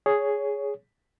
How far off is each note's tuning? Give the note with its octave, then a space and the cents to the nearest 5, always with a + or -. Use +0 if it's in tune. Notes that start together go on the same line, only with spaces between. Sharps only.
G#4 +0 C#5 +15